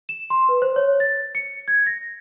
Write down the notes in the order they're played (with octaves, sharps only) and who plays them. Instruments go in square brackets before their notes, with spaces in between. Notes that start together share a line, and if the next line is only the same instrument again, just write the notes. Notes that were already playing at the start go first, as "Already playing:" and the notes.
[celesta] E7
C6
B4
C5
C#5
A6
C#7
G#6
A#6